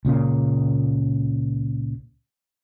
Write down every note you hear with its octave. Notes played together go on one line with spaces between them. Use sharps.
C#2 A#2 C#3 A#3